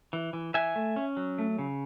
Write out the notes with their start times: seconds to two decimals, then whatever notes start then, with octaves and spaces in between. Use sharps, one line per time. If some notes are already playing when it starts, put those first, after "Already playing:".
0.13 E3
0.33 E3
0.54 E3 E5 G#5
0.76 A3
0.96 C#4
1.17 F#3
1.38 A3
1.59 C#3